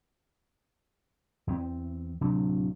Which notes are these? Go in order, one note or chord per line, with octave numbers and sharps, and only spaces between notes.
E2 C4
D1 C3 F#3 D4